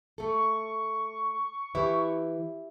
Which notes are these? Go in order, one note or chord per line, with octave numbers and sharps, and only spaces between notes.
A3 A4 C#6
E3 E4 G4